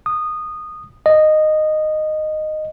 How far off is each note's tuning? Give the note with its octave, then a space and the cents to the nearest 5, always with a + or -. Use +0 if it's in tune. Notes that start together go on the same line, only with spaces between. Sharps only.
D#6 -15
D#5 -10